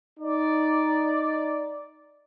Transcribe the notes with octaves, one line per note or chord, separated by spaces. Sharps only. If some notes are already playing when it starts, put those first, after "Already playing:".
D#4 D5